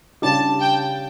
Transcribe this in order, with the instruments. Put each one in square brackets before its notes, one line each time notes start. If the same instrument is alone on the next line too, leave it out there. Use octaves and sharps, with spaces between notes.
[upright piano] C#3 G3 D4 G4 [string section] A5
[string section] G5